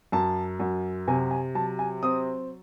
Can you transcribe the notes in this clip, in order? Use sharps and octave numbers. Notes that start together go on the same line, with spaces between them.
F#2 A5
F#2
C3 G#5
G#5
F#3 A5
G#5
C4 D#6